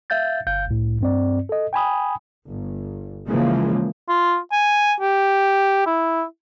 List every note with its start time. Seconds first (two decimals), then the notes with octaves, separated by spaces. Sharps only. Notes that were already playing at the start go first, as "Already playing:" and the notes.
0.10 E5 F5 G6 A6
0.47 G1 F5 G6
0.68 C2 A2
1.01 G2 C4 D5
1.49 A4 D#5
1.73 G5 G#5 B5 D#6
2.50 G1
3.27 C#3 E3 F3 G#3 A#3
4.09 F4
4.52 G#5
5.01 G4
5.86 E4